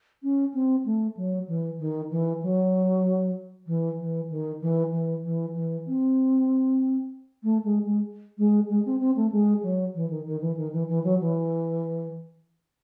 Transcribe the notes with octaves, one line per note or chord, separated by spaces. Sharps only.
C#4
C4
A3
F#3
E3
D#3
E3
F#3
E3
E3
D#3
E3
E3
E3
E3
C4
A3
G#3
G#3
G#3
G#3
C4
C4
A3
G#3
F#3
E3
D#3
D#3
E3
D#3
E3
E3
F#3
E3